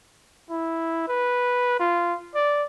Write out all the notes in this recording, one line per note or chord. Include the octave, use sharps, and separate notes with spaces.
E4
B4
F4
D5